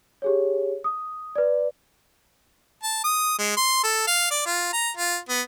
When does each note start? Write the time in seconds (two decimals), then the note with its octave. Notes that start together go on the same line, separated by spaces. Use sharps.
0.22 G4 G#4 C#5
0.84 D#6
1.36 B4 D5
2.83 A5
3.04 D#6
3.38 G#3
3.57 C6
3.83 A4
4.07 F5
4.30 D5
4.46 F4
4.73 A#5
4.97 F4
5.29 B3